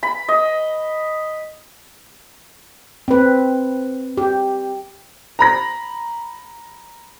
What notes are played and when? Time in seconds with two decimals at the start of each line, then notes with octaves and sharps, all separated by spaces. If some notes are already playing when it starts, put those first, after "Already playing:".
0.03 B5
0.28 D#5
3.08 C4 B4
4.18 G4
5.39 A#5 B5 A#6